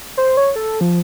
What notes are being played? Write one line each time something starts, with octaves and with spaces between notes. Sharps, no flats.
C5
C#5
A4
F3